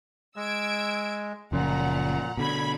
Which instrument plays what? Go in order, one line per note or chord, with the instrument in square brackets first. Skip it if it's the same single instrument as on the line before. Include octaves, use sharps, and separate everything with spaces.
[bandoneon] G#3 [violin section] E6 G#6 D7
[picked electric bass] F#1 C#3 F3 [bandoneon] A#2 [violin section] F#5 A#5
[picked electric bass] B2 D3 [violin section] B5 G#6